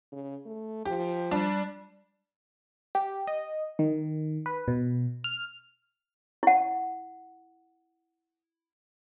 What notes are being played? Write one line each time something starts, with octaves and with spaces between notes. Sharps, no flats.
C#3
A3
F3 G4
G3 D4
G4
D#5
D#3
B4
B2
F6
E4 F#5